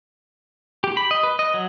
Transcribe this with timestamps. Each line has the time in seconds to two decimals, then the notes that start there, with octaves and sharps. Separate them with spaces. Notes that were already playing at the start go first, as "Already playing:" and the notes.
0.84 G4
0.97 B5
1.11 D#5
1.23 B4
1.39 D#5
1.54 F#3